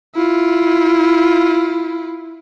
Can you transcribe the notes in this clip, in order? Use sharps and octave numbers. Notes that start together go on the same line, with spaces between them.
E4 F4